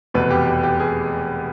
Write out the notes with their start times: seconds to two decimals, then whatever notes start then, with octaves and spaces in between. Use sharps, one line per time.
0.14 F1 E2 B2 B4
0.30 G4
0.47 G4
0.63 G4
0.80 G#4